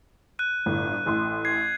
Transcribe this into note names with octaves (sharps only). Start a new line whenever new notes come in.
F#6 D#7
G1 A2
A1 A2 C6
G#6 C7